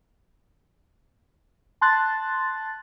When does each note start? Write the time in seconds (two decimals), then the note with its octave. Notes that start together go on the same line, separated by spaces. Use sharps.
1.81 A5 C6 F#6 A6